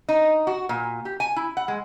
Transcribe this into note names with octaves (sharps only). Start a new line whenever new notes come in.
D#4
F#4
A#2
G4
G#5
E4
F#5
G#3